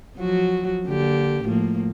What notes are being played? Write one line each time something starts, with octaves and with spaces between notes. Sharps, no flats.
F3 F#3 F#4
D3 A#3 G4
A2 F3 A#3